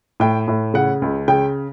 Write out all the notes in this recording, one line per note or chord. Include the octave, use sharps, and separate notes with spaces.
A2 G5
A2
C#3 F#5
C#2
C#3 G5